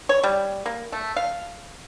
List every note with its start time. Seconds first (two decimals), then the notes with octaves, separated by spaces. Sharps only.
0.09 C#5
0.23 G3
0.66 A#3
0.92 A3
1.16 F5